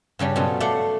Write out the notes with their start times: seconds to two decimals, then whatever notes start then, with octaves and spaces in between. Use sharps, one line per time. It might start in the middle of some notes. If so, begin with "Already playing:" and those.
0.19 G2 C#3 G3 C#4
0.36 B2 F3 F#3 C#4 F4 A4
0.60 A3 D5 F5 F#5